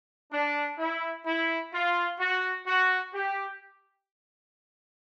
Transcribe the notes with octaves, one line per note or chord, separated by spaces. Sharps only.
D4
E4
E4
F4
F#4
F#4
G4